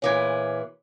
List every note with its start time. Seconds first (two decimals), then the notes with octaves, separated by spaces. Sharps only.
0.02 A#2 E3 G#4 C#5 D6 G#6